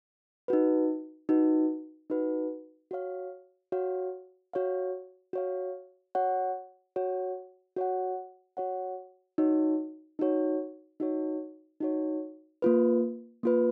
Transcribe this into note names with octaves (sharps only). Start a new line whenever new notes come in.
D#4 F#4 B4
D#4 F#4 B4
D#4 F#4 B4
F#4 C#5 F5
F#4 C#5 F5
F#4 C#5 F5
F#4 C#5 F5
F#4 C#5 F#5
F#4 C#5 F#5
F#4 C#5 F#5
F#4 C#5 F#5
D#4 F#4 C#5
D#4 F#4 C#5
D#4 F#4 C#5
D#4 F#4 C#5
A#3 F4 B4
A#3 F4 B4